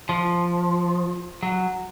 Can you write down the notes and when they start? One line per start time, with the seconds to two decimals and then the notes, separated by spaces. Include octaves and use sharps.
0.09 F3
1.43 F#3